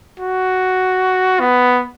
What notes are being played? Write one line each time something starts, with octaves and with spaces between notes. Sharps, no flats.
F#4
B3